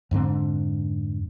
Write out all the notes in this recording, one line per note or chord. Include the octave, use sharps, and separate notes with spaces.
F2 G#2 D3 C4